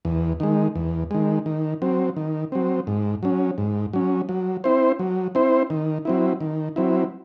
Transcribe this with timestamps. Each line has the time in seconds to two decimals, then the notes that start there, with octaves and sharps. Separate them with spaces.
0.05 E2
0.40 D#3 G#3
0.76 E2
1.11 D#3 G#3
1.46 D#3
1.82 F#3 C4
2.17 D#3
2.52 F#3 C4
2.87 G#2
3.23 F#3 C#4
3.58 G#2
3.93 F#3 C#4
4.29 F#3
4.64 C4 E4 C5
4.99 F#3
5.35 C4 E4 C5
5.70 D#3
6.05 F#3 C4 E4
6.40 D#3
6.76 F#3 C4 E4